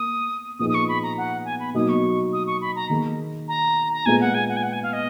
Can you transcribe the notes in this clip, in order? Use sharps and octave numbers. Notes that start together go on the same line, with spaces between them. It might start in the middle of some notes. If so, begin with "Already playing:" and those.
Already playing: A#3 D#6
A#2 F3 B3 D#4 G#4 D#6
D#6
C#6
B5
A#5
F#5
G#5
B5
B2 F#3 A#3 D#4 D#6
C#6
D#6
C#6
B5
A#5
D#3 A#3 D#4 G#4
A#5
A#5
A#2 G#3 B3 F4 G#4 G#5
F#5
G#5
F#5
G#5
F#5
G#5
F5
D#5